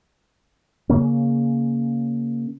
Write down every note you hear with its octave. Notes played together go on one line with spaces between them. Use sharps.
C#3 A#3 C#4